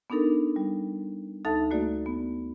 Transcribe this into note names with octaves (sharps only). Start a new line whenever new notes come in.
B3 D4 D#4 A4 A#4
G3
D2 D#4 A4 E5 A5 A6
A3 A#3 F#4 D5
B3